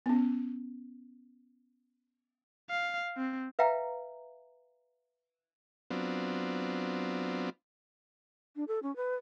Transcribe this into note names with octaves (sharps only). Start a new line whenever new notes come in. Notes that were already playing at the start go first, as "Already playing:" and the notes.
B3 C#4
F5
C4
B4 E5 F5 G5 A#5
F#3 B3 C4 D4 F4
D4
A4
C#4
B4